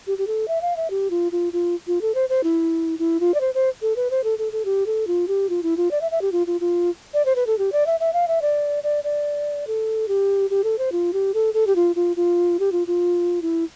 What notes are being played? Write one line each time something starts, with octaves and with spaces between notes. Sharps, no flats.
G4
G4
A4
E5
F5
E5
G4
F4
F4
F4
F4
A4
C5
C5
E4
E4
F4
D5
C5
C5
A4
B4
C5
A4
A4
A4
G4
A4
F4
G4
F4
E4
F4
D5
E5
E5
G4
F4
F4
F4
D5
C5
B4
A4
G4
D5
E5
E5
F5
E5
D5
D5
D5
A4
G4
G4
A4
C5
F4
G4
A4
A4
G4
F4
F4
F4
G4
F4
F4
E4